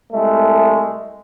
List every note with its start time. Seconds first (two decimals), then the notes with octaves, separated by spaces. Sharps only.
0.12 C2 G#3 A3